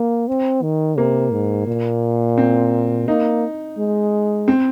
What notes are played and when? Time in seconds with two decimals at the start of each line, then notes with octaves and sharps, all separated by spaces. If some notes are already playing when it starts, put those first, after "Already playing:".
Already playing: A#3
0.28 C4
0.62 D#3
0.98 C3 A#3
1.32 G#2
1.67 A#2
2.38 C4
3.08 A#3 D#4
3.78 G#3
4.48 C4